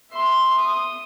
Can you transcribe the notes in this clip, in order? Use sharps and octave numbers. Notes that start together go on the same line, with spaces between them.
E5 C6
D#6